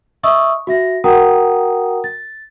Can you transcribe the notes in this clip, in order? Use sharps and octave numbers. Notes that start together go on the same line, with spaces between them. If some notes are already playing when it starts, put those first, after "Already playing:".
D#5 E5 C#6 D#6 E6
F#4 E5 A#6
F#4 A#4 F#5 G5 A#5 D#6
A6